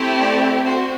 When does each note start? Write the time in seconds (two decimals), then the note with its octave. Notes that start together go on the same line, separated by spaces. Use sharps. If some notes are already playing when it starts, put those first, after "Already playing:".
Already playing: A3 C4 E4 G4
0.20 D5
0.65 C4 F#4 C5